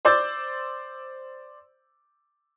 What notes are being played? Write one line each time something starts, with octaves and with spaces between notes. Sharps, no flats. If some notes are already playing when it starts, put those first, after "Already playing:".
C5 D5 D6 E6 G6 A6